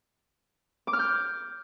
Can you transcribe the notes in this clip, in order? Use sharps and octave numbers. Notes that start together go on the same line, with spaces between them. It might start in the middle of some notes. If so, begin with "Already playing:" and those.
D6
F6
G6